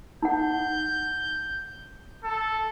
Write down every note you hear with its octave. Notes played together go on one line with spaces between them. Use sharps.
D#4 F#5 G6
A4